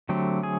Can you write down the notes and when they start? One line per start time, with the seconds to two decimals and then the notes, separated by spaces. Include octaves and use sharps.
0.09 D3 F#3 A3 C4 G4
0.43 G#4